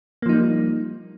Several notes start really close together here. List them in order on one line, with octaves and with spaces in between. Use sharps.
A#3 F3 D#4 G3